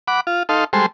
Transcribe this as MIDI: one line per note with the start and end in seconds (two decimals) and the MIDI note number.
0.08 0.20 78
0.08 0.20 83
0.08 0.20 86
0.27 0.43 65
0.49 0.64 63
0.49 0.64 69
0.49 0.64 77
0.49 0.64 84
0.73 0.86 55
0.73 0.86 56
0.73 0.86 69
0.73 0.86 72
0.73 0.86 84